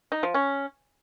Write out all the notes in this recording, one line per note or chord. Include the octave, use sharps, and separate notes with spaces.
D#4
F3
C#4